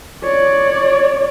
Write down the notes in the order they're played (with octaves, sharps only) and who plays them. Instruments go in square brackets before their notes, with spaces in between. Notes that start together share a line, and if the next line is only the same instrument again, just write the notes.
[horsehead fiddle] C#5 D5